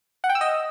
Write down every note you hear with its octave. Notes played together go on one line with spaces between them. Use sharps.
F#5
G5
E6
D#5